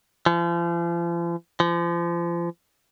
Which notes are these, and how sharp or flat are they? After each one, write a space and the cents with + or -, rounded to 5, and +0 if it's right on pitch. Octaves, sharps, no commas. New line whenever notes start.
F3 -40
F3 -35